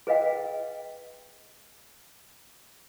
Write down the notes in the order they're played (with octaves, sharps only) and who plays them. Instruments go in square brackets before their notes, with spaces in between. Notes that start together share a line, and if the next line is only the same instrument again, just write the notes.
[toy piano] G#4 B4 D#5 F5 G5